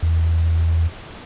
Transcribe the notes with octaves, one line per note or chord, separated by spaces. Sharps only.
E2